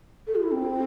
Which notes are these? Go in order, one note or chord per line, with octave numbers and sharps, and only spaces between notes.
A4
F4
E4
C4